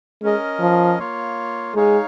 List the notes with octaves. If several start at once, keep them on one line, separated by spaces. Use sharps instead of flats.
G#3 C#4 A#4 D#5
F3
A#3 F4 C#5 F5
G#3 D#4 C#5 F5